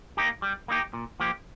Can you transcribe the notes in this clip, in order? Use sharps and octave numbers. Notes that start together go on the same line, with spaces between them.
A#3 D#4 G4
G3
A#3 D#4 G4
A#2
F3 A#3 G4